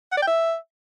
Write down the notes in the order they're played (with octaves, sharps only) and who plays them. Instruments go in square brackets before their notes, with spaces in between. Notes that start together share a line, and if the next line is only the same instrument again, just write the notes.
[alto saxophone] F#5
D5
G5
E5